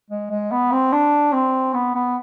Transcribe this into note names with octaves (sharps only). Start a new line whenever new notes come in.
G#3
G#3
B3
C4
D4
C4
B3
B3